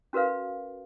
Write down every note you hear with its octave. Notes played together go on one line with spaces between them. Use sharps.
C#4 F#4 A#4 B4 F5